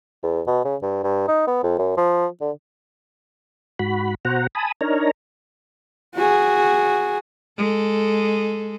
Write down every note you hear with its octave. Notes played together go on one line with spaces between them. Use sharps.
E2
B2
C#3
G2
G2
D#4
B3
F2
F#2
F3
D3
G#2 F#4 B5
B2 F#4 C5 F#5 A#5
G#5 A5 B5 D#6
D4 D#4 A#4 C#5 A#5
F#4 G#4
G#3 A4